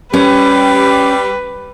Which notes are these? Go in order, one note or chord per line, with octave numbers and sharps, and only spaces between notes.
G3 C#4 G4 B4